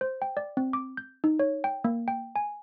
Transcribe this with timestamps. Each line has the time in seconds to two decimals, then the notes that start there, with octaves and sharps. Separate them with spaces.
0.01 C5
0.22 G5
0.37 D5
0.57 C4
0.73 D6
0.97 G6
1.24 D#4
1.39 C#5
1.64 G5
1.84 A#3
2.08 G5
2.36 G#5